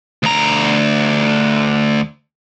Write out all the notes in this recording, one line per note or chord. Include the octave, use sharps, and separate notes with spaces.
D2 A#5